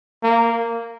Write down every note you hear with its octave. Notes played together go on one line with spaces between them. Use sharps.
A#3